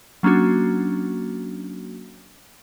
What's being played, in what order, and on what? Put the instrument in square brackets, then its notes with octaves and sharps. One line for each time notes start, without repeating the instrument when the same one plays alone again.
[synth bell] F#3 A#3 C#4 D4 F#4